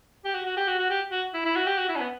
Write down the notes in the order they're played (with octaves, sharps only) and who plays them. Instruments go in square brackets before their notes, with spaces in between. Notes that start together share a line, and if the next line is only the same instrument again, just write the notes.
[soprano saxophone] G4
F#4
F#4
G4
F#4
F#4
G4
F#4
E4
E4
F#4
G4
F#4
E4
C#4
B3